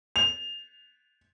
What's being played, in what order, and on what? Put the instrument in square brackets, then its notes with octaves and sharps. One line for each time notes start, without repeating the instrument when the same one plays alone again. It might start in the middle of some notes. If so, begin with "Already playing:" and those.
[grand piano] F7